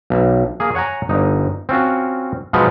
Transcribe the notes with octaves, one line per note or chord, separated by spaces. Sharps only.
B1
A#3 G#4
C#5 F#5 G#5 A#5
G1 D#4
C4 C#4 F4 F#4
B2 F3 F#3 G#3 B3 D#4